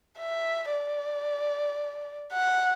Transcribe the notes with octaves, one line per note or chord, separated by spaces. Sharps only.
E5
D5
F#5